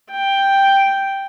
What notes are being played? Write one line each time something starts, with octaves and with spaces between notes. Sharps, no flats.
G5